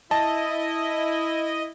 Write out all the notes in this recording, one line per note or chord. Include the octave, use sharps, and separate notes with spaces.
E4 D#5 A5